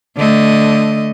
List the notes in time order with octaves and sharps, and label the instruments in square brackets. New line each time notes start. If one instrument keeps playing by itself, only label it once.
[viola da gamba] D3 A3 D#5